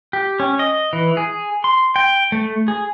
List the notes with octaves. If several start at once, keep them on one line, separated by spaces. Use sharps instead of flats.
G4
C#4
D#5
E3
G#4
C6
G5
A3
G#4